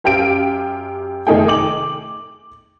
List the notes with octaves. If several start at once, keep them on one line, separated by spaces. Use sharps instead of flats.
F#2 G4 F5 G5 D7
F1 D#3 A3 D#4 G#4 G5
D6 F#7